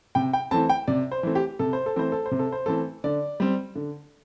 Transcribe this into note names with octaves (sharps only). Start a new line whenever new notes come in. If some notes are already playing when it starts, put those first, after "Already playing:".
C3 G5
G5
E3 A3 C4 A5
G5
C3 D5
C5
E3 A3 C4
G4
C3 A4
C5
A4
E3 A3 C4 C5
A4
C5
C3
A4
C5
E3 A3 C4 A4
D3 D5
G3 C4
D3